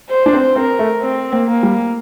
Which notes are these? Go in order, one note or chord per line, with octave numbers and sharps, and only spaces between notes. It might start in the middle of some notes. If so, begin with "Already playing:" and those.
C5
D4
C4
C4 A#4
A3
C4
A#3
A#3
G3